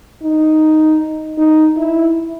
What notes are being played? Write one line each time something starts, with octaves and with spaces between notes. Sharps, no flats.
D#4
D#4
E4